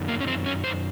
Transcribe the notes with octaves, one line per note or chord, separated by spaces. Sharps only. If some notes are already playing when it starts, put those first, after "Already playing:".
Already playing: F#2 D#3
A#3
C#4
C4
C#4
C5